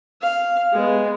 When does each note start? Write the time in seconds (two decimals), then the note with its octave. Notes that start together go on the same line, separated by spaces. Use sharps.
0.21 F5
0.72 G#3 B3